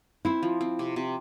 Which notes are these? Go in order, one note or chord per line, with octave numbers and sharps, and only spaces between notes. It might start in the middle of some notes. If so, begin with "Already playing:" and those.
C4 E4
F3
C4
C3
C3